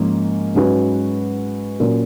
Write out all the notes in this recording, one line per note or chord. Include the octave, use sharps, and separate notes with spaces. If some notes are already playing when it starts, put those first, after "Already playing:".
Already playing: G#2 F3 A#3 C#4
G#2 F#3 C#4 F#4 B4
A#2 F#3 C#4 F4 A#4